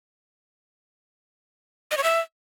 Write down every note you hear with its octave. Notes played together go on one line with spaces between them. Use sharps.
D#5
C#5
E5